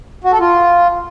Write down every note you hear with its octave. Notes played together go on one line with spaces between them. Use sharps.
F#4
A4
F4